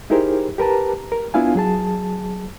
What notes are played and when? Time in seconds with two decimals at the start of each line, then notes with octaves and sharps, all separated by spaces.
0.10 D#4 E4 G4 G#4 A#4 C5
0.58 G4 A#4 B4 A5 A#5
1.12 A#4
1.34 B3 D4 E4 F4 F5 G#5
1.55 F#3 G#4 A5